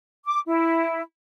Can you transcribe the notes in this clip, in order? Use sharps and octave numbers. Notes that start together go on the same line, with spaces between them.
D6
E4